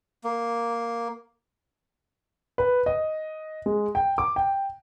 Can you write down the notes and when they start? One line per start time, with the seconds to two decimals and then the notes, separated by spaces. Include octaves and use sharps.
0.24 A#3
2.58 B4
2.86 D#5
3.66 G#3
3.95 G5
4.18 D6
4.36 G5